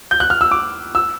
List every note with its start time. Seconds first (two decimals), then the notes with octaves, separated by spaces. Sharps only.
0.11 G6
0.20 F#6
0.30 F6
0.41 E6
0.51 D6
0.95 E6